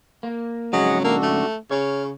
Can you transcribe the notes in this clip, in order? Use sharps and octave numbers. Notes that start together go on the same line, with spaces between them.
A#3
F2 G#2 C#3 F#3 G#4 D#5 F#5
A#3 D4 F#4 A4
A3
C#3 C#5 F6